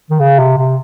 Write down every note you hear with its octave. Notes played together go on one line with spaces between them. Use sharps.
D#3
C#3
C3
C3